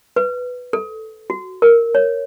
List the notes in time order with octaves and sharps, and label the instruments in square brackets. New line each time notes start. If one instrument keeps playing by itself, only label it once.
[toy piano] B4
A4
F#4
A#4
C#5